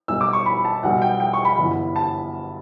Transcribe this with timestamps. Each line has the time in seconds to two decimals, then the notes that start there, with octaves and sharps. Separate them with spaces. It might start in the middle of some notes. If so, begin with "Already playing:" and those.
0.08 B1 B2 G3 E6
0.21 D6
0.33 C#6
0.46 B5
0.65 A5
0.83 B1 B2 G3 F#5
1.02 G5
1.20 G5
1.33 C#6
1.45 B5
1.58 G1 F#2 E3
1.96 A5